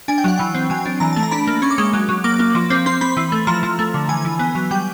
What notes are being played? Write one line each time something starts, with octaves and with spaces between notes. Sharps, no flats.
D4 G#5
G5
F#3 F#5
E3 G5
C4
F#3 G#5
D4
E3 A#5
A3 A5
A#5
D4 B5
A#3
C#4 C#6
D6
G#3 C#6
F#3
F#3
A#3 D6
A#3
F3
C4
C4 C6
C4 B5
E3
A3
F3 A#5
F3
A3
D3
E3 G#5
E3
B3
F#3
G3 G5